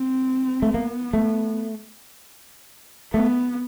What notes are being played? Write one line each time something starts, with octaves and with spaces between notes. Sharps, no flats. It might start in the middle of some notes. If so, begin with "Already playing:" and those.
Already playing: C4
A3
A#3 B3
A3
A3 B3